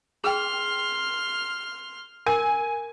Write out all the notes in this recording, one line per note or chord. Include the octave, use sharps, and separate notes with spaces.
G#4 G5 C6 F6
A#4 G#5